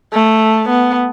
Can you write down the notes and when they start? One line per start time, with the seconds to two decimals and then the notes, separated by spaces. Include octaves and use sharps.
0.13 A3
0.69 B3